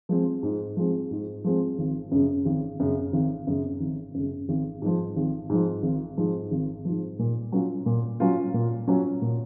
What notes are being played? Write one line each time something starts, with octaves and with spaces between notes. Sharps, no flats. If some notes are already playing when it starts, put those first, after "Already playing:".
F3 G#3 C4
G#2
F3 G#3 C4
G#2
F3 G#3 C4
G#1
F#2 C#3
G#1
F#2 C#3
G#1
F#2 C#3
G#1
F#2 C#3
G#1
G#2 F3
G#1
G#2 F3
G#1
G#2 F3
G#1
G#2 F3
A#2
F#3 C#4 F4
A#2
F#3 C#4 F4
A#2
F#3 C#4 F4
A#2